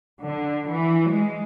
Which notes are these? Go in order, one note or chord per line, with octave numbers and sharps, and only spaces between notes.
D3
E3
G#3